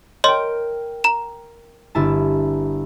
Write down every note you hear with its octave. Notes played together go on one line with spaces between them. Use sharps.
A#4 C#5 D#5 G5 C6
A#5 E7
G1 E4 A5